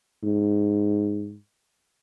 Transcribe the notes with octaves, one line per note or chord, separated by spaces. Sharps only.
G#2